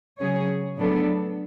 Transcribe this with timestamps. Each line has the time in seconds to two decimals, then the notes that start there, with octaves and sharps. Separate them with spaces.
0.20 C#3 F#3 C#4 G#4 C#5
0.76 A2 F#3 B3 D4 A4